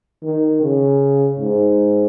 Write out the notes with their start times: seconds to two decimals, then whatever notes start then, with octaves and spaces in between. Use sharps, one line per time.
0.23 D#3
0.62 C#3
1.40 G#2